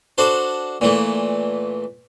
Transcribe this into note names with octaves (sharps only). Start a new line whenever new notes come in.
D4 F#4 A4 C5
A#2 E3 A3